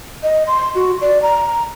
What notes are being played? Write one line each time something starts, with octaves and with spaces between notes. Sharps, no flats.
D#5
C6
F#4
D5
A#5